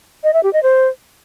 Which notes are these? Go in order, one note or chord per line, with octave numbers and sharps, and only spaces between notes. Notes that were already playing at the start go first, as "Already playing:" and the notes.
D#5
E5
G4
D#5
C5